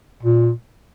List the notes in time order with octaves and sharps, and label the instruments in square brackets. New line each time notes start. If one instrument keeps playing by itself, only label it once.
[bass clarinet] A#2